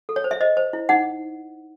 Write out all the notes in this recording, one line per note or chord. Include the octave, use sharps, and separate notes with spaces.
A4
C#5
C5
E5
C5 D#5
C5
E4
D#4 F#5